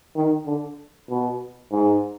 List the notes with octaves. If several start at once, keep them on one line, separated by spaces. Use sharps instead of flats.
D#3
D3
B2
G#2